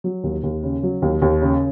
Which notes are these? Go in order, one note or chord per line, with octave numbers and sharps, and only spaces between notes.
F#3
D#2
D#2
C#3
F#3
D#2
D#2
C#3